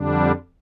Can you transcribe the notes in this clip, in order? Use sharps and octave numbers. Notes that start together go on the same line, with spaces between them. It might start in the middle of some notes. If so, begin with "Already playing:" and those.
Already playing: F2 D3 G3 D4